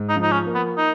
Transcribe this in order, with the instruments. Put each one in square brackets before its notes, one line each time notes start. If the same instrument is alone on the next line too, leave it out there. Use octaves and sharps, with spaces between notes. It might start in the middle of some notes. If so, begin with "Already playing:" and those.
Already playing: [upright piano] G#2
[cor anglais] D#4
[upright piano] F3
[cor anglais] D#4
C#4
[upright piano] A#3
[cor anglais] B3
D#4